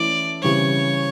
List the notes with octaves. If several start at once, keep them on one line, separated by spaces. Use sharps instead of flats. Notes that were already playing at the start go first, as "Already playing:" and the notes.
Already playing: E3 A3 C#4 E4 D5
C#3 E3 G3 C4 C#5